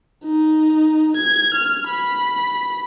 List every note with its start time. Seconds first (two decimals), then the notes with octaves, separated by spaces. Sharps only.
0.25 D#4
1.16 G#6
1.54 F6
1.88 B5